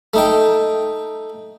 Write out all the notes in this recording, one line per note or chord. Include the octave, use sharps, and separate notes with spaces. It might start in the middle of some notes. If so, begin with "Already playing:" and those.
A3 D#4 G5